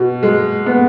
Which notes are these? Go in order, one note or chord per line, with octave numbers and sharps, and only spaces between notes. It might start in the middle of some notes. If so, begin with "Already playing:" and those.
Already playing: B2
G#3
B3